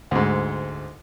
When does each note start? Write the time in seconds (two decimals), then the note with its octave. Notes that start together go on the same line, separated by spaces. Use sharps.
0.11 D2 G#2